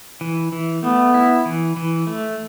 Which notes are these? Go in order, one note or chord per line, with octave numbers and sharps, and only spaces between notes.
E3
E3
A3 B3
E4
E3
E3
A3